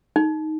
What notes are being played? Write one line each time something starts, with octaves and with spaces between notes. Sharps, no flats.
D#4